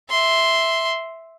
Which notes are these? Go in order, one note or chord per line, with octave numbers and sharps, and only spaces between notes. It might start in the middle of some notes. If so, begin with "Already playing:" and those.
E5 C6